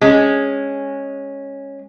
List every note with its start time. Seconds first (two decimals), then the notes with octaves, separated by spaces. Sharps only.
0.01 G#3 C#4